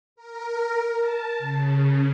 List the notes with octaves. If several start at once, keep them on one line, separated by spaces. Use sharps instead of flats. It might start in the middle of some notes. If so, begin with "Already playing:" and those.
A#4
A5
C#3